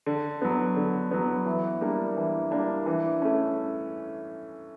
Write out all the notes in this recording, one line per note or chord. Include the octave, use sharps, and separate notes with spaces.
D3
F#3 B3
D3
F#3 B3
E3
G3 A#3 D4
E3
G3 A#3 D4
E3
A3 C#4